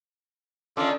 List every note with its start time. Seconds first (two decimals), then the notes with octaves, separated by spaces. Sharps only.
0.77 D3 D#3 C#4 D4 F4 A4 D6